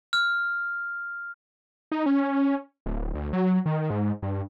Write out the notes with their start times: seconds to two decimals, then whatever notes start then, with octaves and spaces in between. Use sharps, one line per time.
0.13 F6
1.92 D#4
2.06 C#4
2.86 D1
3.15 D2
3.33 F#3
3.66 D#3
3.90 G#2
4.22 G2